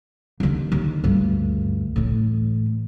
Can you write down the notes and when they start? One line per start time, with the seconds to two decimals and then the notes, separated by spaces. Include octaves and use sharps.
0.40 D#2 D3
0.72 D#2
1.04 D2 G2
1.96 A2 E3